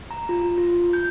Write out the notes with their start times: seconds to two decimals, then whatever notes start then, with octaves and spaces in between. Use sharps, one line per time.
0.11 A#5
0.29 F4
0.58 F4
0.93 G6